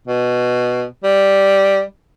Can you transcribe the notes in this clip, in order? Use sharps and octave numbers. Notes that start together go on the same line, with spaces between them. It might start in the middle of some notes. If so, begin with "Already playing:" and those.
B2
G3